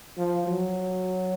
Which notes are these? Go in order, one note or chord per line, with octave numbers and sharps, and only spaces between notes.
F3
F#3